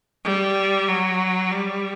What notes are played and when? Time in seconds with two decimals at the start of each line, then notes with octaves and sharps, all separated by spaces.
0.25 G3
0.88 F#3
1.51 G3